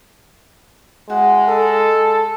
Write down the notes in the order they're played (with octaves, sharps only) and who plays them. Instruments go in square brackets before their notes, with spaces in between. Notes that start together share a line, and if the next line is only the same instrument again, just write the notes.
[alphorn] G#3 [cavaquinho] E4 F#4 F#5
[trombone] A4 [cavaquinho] D#6